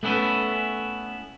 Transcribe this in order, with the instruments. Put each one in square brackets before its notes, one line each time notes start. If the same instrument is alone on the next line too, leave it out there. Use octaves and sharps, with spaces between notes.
[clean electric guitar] A3 B3 C#4 E4 A4 B4